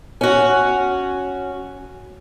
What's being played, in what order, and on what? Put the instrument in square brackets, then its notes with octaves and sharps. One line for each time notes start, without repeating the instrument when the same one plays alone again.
[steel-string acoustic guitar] C#4 F#4